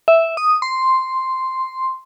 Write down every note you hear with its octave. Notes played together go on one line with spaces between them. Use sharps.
E5
D#6
C6